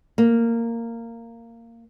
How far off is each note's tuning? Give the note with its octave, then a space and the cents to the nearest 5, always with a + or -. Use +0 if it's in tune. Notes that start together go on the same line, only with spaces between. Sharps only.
A#3 -15